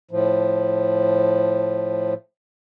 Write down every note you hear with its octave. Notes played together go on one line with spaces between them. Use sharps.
A2 F3